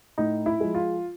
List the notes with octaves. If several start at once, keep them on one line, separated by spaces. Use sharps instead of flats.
A2 D#4
E4
F3 G#3
F4